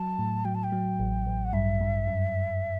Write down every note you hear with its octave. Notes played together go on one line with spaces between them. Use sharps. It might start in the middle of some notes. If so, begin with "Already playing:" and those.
Already playing: F#3 A5
A2
F#3 G5
A5
G5
F#3
A1
A1
F#5
G2 E5
G2
F#2